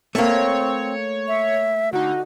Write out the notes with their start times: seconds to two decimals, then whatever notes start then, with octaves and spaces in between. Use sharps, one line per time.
0.15 A3 A#3 C4 C#5
1.28 E5
1.93 D3 D#4 F#4